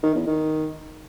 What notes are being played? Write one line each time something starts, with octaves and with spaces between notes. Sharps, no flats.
D#3
E2
D#3